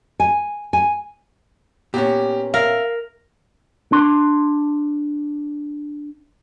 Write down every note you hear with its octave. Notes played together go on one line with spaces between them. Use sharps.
G#5
G#5
A#2 B3 C#4 G4
A#4 E5 F5
D4 C6